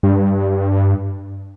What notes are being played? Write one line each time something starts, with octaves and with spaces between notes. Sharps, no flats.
G2